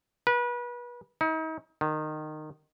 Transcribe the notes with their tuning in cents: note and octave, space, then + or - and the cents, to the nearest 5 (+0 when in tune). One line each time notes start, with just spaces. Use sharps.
B4 -30
D#4 +40
D#3 -20